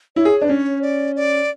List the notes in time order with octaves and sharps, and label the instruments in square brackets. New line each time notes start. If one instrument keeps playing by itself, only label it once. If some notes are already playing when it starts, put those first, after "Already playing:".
[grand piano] E4 [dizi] C#5
[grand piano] G#4
D4
[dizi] B4
[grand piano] C#4 [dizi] C#5
[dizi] D5
D5